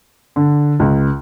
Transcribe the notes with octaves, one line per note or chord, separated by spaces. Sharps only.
D3
C#2